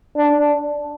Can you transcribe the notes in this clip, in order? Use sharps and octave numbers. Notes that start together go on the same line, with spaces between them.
D4